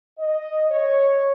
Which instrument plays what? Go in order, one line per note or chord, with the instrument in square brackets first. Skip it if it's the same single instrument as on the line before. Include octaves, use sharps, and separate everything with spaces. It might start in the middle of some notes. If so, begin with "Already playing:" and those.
[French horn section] D#5
C#5